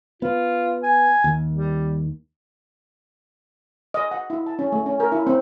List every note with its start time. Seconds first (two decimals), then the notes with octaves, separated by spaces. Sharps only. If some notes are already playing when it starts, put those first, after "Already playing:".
0.22 B3 F4
0.83 G#5
1.24 D#2
1.50 G3
3.94 D#5
4.11 F#5
4.30 E4
4.46 A5
4.59 C#4
4.72 A3
4.86 C#4
5.00 A#4
5.12 E4
5.27 C4